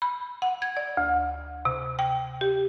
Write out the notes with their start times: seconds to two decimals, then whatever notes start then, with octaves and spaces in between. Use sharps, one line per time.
0.02 B5
0.42 F#5
0.62 G#6
0.77 D5
0.97 D2
1.65 C3
1.99 G5
2.41 G4